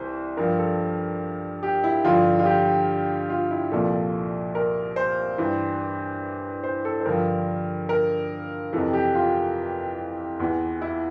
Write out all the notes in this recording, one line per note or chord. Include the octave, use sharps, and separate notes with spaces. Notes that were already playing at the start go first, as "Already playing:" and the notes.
Already playing: C2 E3 C5
G2 F3 A#4
A4
G4
E4
G2 D3 F3 F4
F4
G4
F4
E4
C2 A#2 F3 A4
A#4
C5
G2 E3
C5
A4
C5
G2 D3 F3 A#4
A#4
F2 C3 E3 A4
G4
F4
E2 E3
E4